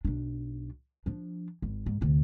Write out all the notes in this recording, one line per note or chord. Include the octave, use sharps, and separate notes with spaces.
B1 D4
F3 D4
G#1
G#2
D2 C3